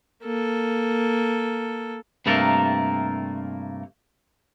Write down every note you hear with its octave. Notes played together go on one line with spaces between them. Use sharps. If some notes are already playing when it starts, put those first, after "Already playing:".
A#3 A4
G2 C3 A3 A#3 A4 A#4